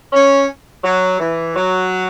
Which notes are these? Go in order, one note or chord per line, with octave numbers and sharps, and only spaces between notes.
C#4
F#3
E3
F#3